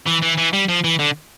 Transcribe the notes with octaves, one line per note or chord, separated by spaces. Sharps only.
E3
E3
E3
G3
F3
E3
D3